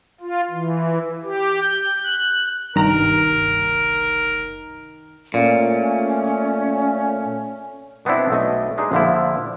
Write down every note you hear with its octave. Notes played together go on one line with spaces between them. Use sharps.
F4
E3
G4
G6
F#6
F#1 C2 G2 D#3 A#4 A#5
A#2 A3 C#4
B2 B3 C4 D4 E4
B1 A3 D#5
G#3 D4 D#4 G#4
A#1 D3 F3 E4